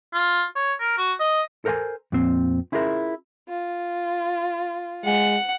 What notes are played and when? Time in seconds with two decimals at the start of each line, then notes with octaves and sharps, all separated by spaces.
0.13 F4
0.56 C#5
0.80 A#4
0.98 F#4
1.20 D#5
1.65 A4 A#4 C5 F5 G#5
2.12 F2 A#2 C4
2.72 C#4 E4 F4 G#4 A#4 E5
3.48 F4
5.05 G#3 F#5